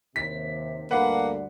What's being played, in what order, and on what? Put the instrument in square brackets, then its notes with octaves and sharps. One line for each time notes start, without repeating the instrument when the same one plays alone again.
[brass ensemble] D#2 C3 [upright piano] B6
[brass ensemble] D2 G2 D3 [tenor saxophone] A#3 [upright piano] B4 F#5